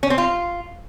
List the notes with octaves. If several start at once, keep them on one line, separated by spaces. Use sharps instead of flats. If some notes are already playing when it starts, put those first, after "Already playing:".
C#4
C4
F4